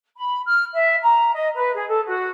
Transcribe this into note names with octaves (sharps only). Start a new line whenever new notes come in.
B5
F6
E5
A#5
D#5
B4
G#4
A4
F#4